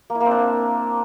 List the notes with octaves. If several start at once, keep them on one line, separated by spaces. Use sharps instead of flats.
A#3
E4
A#3
C4
D4